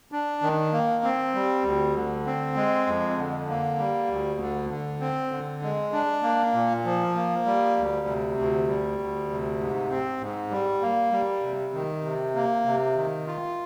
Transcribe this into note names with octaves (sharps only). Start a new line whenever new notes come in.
D4
D#3
A#3
C4
G3
D2
D3
C4
G#3
F2
D3
A#3
G3
D2
D3
D3
C4
D3
G#3
D4
A#3
A#2
F3
A#3
G3
D2
C3
D2
G3
D2
C3
G#2
C4
G#2
G3
A#3
G3
C3
D#3
C3
A#3
C3
D#3
F4